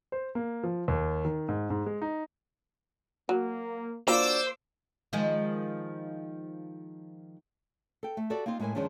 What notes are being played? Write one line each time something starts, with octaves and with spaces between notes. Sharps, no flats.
C5
A#3
F3
D#2
D#3
G#2
G#2
G#3
D#4
F#3 A#3
A#3 D4 F4 F#4 C5 D5 D6 E6
D#3 F3 G#3
A4 G5
A3
F#4 G4 A4 D5
A#3 C4 D#4 F4
A2 G#3 E4 A4 A#4 G#5
F#2 D#3 F3 G#3 C#4 D4